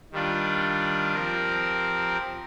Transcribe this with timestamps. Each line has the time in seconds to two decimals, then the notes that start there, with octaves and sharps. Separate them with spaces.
0.12 D#3 G3 D4 F4
1.14 F3 C4 G4 A#4